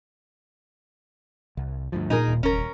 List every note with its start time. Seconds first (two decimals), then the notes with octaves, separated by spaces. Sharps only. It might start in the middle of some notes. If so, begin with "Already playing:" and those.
1.57 C2
1.92 D2 G2 F3
2.10 A#2 D#4 G#4 A#4
2.28 D#1
2.43 F1 C#4 A#4